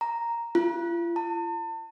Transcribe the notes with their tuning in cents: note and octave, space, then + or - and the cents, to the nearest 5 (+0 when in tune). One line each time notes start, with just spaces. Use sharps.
A#5 +0
F4 -40
A5 +40